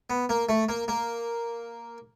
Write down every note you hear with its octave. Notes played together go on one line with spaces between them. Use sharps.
B3
A#3
A3
A#3
A#3